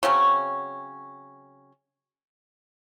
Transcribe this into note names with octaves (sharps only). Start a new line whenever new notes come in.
C#3 F#3 C4 C#4